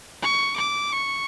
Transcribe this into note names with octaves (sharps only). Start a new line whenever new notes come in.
C#6
D6
C#6